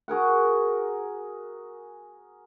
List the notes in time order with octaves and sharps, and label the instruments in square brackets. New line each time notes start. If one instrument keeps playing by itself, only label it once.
[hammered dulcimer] F#4 G#4 A#4 F#5